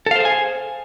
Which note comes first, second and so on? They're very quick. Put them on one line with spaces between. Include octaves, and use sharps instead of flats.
A4 F5 C5 G#4 G#5